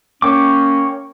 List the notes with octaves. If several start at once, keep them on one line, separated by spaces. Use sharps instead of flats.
A#3 C#4 C#5 G5 D6